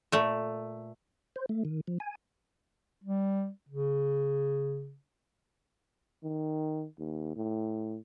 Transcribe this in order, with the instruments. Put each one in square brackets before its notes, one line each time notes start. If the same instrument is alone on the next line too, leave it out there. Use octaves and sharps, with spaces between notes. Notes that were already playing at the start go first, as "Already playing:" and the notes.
[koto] A#2 A3
[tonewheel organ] C5
A3
D#3
F3
G#5
[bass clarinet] G3
C#3
[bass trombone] D#3
D#2
A2